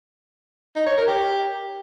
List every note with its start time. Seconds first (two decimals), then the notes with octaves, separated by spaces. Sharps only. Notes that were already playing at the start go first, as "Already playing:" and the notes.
0.76 D#4
0.86 C#5
0.97 A#4
1.07 G4